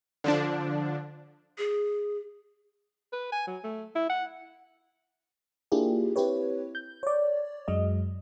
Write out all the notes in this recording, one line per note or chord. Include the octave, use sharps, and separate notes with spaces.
D3 F3 D4
G#4
B4
G#5
F#3
A3
E4
F#5
A#3 D4 E4 F4 G4 G#4
C4 E4 G4 B4 C#5
G6
C#5 D5
F#2 F#3 G#3 D#5